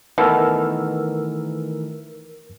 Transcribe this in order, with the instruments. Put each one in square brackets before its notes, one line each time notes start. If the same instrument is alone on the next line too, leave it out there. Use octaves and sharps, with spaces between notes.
[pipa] B2 [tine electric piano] D#3 E3 A3 [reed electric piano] A#4 E6 F6